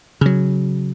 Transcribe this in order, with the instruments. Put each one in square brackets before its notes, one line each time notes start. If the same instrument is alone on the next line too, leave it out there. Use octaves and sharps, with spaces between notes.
[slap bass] C#3 F#3